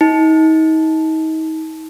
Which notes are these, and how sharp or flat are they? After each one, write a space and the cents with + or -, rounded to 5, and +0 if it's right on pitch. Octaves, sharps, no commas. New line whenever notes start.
D#4 +35